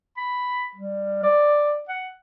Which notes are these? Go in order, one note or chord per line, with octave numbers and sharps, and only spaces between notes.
B5
G3
D5
F#5